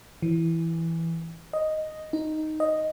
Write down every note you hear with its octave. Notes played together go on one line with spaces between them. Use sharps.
E3
D#5
D#4
D#5